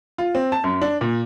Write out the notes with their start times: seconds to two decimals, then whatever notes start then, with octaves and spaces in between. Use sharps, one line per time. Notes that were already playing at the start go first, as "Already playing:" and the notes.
0.18 F4
0.35 C4
0.52 A5
0.64 F#2
0.81 D4
1.01 A#2